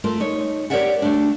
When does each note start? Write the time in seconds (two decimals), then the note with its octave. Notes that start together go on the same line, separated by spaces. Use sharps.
0.04 A3 F4 A#4
0.20 D#4 C#5
0.70 G4 A#4 C#5 D5 E5 F#5
1.02 A3 D4